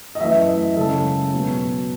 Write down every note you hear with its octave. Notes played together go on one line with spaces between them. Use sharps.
D#5
F#2 E3 A3 E5
D#5
F#2 C#3 G#3 A4
B2 F#3 B3